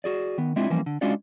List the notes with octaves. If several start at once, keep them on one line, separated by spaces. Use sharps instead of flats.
F#4 G#4 D5
D#3 B3
G#3 C4 D4 E4 F4
E3 F3 G3 A#3 C#4
D3
G#3 C#4 D4 F4 F#4 D5